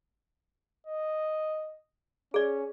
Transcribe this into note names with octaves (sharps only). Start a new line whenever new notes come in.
D#5
C#4 G#4 D5